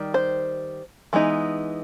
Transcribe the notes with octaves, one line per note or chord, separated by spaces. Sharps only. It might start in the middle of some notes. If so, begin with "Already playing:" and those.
Already playing: D#3 G3
C5
E3 G#3 B3 D#4